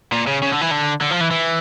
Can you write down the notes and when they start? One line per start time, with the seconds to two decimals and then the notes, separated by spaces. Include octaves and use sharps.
0.12 A#2
0.27 C#3
0.42 C#3
0.52 D3
0.61 E3
0.71 D3
1.02 D3
1.11 F3
1.21 E3
1.31 E3